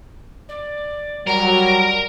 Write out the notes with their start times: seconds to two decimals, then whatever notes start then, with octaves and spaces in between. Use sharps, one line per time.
0.48 D5
1.27 F#3 G3 A#4 A#5